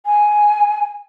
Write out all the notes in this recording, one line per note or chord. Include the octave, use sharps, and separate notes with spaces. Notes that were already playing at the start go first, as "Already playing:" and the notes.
G#5